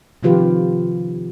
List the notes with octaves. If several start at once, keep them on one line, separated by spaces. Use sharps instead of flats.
C3 D#3 F3 F4 G4 B4